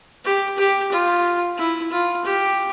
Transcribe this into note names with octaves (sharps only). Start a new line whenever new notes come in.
G4
G4
F4
E4
F4
G4